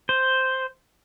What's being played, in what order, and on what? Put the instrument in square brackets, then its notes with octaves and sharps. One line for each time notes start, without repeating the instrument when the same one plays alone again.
[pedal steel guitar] C5